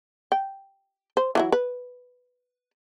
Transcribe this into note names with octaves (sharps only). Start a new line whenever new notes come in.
G5
C5
E3 F#3 E4
B4